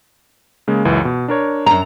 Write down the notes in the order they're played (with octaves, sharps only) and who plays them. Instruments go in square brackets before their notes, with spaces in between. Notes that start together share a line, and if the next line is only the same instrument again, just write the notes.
[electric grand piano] C#3 G#3 A#3
C#2 F#2 E3
B2
D4 A#4 C#5
[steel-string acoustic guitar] F#2 A#5